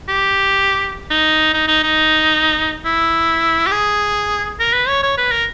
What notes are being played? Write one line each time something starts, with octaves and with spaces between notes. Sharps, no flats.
G4
D#4
D#4
D#4
D#4
E4
G4
G#4
A#4
B4
C#5
C#5
B4
A#4